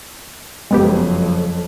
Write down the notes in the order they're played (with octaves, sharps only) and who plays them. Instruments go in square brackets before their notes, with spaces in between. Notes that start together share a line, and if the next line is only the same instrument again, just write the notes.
[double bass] F#1 F2 [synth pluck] G#3 B3 G4